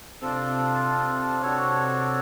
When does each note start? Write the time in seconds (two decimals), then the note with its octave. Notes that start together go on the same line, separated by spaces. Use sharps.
0.21 C3 C4 D4 F4 A4
1.42 D4 F#4 A4 C#5